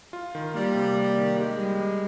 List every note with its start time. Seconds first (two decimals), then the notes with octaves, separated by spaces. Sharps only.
0.13 F4
0.35 D#3
0.54 G3 A#3
0.75 C3
0.96 A#3
1.17 D#3
1.37 G#3 G4
1.59 G3
1.79 G3